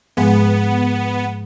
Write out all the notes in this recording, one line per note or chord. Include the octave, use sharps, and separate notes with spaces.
G#2 F3 G#3 B3